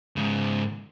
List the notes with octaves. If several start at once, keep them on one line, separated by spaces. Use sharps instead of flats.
G#2 C#3